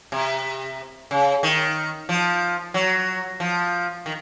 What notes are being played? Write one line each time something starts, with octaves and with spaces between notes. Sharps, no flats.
C3
C#3
D#3
F3
F#3
F3
D#3